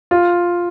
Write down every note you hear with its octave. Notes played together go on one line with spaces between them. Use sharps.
F4